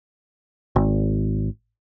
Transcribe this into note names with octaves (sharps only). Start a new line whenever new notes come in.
G#1